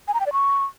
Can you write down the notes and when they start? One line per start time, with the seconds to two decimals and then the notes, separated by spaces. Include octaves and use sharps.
0.08 G#5
0.14 A#5
0.20 G5
0.26 D5
0.33 C#6